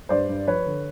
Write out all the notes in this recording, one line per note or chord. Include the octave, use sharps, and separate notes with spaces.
G2 C5 D5
G2
F3 B4 C#5
D3